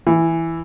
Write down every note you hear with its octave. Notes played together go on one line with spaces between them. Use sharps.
E3